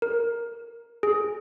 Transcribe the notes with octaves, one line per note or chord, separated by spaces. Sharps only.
A#4
G#4